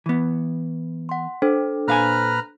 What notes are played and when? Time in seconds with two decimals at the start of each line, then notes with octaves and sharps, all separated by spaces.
0.06 E3 B3
1.09 F#5 C6
1.42 D4 A4 C5
1.88 A#2 B4 F5 G#5 A#5 F6